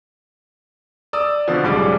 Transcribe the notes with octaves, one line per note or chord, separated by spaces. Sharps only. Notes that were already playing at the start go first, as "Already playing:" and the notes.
D5 D#6 E6
B2 D3 F3
B1 G#2 C#3 G3 D5 D6